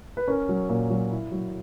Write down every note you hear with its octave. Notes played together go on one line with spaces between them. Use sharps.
B4
C#4 A#4
F#3
A#2
F#3
E4
F#3